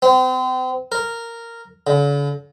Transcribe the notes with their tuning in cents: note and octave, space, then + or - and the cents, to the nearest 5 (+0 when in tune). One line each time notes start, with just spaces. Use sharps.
C4 -35
A#4 -10
D3 -45